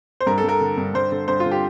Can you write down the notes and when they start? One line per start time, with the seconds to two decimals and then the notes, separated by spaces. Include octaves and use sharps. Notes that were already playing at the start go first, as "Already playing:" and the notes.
0.20 C5
0.27 G2 A#4
0.38 A4
0.44 G2 A#4
0.61 D3
0.77 G2
0.94 G2 C5
1.12 D3
1.28 G2 C5
1.40 F4
1.45 D3
1.51 G4